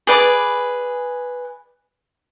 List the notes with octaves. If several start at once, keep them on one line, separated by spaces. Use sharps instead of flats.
G#4 B4 D5 D6